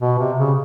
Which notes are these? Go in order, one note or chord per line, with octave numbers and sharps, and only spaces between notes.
B2
C3
C#3